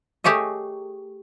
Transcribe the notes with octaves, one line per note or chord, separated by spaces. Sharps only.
A3 G4 G#4 C#5 D#5